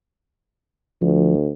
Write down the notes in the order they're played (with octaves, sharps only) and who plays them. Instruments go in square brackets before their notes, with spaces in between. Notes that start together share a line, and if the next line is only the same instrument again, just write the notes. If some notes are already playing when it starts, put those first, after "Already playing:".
[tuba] D2 [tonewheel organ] F3